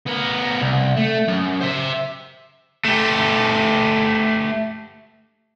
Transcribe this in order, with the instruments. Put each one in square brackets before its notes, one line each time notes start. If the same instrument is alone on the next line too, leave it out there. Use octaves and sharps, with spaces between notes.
[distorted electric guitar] B3 A#4
C2
A3
F#2
C5 E5
[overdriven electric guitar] A3 G4